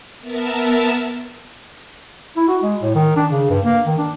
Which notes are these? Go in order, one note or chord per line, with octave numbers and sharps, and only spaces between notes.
B3 A#4 E5 A5
E4
F#4
G#3
A2
D#3
D4
C#3
G2
A#3
D#3
D4